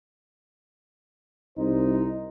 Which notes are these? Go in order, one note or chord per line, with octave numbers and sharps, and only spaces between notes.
C2 D#4 C5